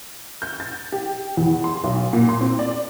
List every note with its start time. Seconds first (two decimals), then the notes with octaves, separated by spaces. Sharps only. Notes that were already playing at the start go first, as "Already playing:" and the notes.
0.42 G6
0.60 A6
0.92 G4
1.37 E2
1.64 C6
1.84 B1
2.13 A#2
2.29 C6
2.41 C4
2.59 D5